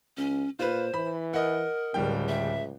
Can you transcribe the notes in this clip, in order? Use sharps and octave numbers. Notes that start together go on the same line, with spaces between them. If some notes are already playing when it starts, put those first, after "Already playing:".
C#2 C#4
A#2 F4 B4 C5
E3 B5
A#4 D#5 F#5
D1 C#2 G3 G5
E5